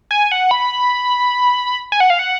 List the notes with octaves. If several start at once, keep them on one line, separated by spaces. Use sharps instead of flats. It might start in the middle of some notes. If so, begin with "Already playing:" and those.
G#5
F#5
B5
G#5
F#5
F5
F#5